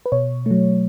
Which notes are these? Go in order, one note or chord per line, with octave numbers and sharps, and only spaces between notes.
B4
B2 C#5
F#3 A3